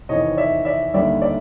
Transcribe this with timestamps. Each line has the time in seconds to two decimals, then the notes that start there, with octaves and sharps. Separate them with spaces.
0.09 E2 C3 D#3 C#5 D#5
0.37 D5 E5
0.65 D5 E5
0.94 D#2 D3 G3 D5 E5
1.22 D5 E5